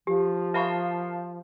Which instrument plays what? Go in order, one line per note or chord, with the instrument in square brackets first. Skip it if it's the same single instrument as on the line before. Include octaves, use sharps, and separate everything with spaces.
[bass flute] F3 [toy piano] G4
[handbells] A#4 F5 A5 [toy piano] E5 B5 C#6